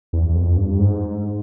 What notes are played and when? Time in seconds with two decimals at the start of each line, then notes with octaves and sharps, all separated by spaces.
0.13 E2
0.29 E2
0.35 F2
0.57 G2
0.79 G#2